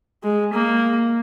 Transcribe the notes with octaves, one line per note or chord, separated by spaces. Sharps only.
G#3
A#3